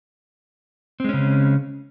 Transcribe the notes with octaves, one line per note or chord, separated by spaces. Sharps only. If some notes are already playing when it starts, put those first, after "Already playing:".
C#3 G#3 C4 C#4